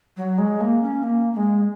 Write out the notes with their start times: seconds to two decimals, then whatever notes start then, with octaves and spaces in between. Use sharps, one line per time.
0.17 F#3
0.38 G#3
0.61 A#3
0.82 C#4
1.03 A#3
1.33 A#3
1.37 G#3